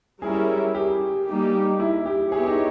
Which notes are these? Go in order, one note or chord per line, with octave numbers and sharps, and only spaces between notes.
G3 C#4 E4 G#4 A#4
G4
G3 A#3 D#4 G4
E4
G4
B3 E4 G4 G#4 C#5
D#4